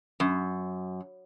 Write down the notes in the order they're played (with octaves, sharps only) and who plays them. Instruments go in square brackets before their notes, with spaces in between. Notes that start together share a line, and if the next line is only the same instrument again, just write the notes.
[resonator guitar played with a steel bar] F#2